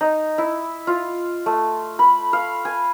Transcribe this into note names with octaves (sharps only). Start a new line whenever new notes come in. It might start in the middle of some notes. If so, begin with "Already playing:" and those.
D#4
E4
F4
A3
B5
F5
G#5